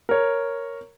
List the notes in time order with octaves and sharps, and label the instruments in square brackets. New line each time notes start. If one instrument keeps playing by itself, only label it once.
[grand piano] A#4 C#5